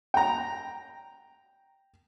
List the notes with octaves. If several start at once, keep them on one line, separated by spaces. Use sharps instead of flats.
G5 A#5